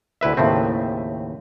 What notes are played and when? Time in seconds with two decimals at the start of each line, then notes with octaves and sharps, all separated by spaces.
0.21 D2 E4 B4 E5
0.37 D#2 A2 C#3 A3 C4